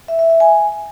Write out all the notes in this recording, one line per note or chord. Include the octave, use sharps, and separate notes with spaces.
E5
E5
E5
G#5